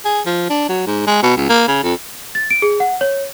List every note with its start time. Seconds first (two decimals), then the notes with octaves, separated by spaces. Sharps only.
0.05 G#4
0.26 F3
0.50 D4
0.69 F#3
0.87 G#2
1.07 G#3
1.22 B2
1.37 C#2
1.49 A#3
1.68 C#3
1.83 F2
2.35 A6
2.51 D7
2.62 G#4
2.80 F#5
3.01 C#5